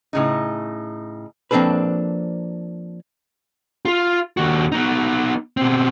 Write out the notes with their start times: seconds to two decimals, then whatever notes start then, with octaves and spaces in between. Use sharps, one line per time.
0.13 A2 C#3 D#4
1.51 F3 A#3 C4 D4 A4 B4
3.85 F4
4.37 D#2 F#4
4.72 B3 D#4
5.57 B2 C4